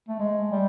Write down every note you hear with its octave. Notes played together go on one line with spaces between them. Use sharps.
A3
G#3
G3